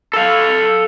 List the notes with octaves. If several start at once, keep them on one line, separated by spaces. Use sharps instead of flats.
A4 F5